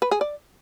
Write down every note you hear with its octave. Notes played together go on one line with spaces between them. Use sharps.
B4
G#4
D5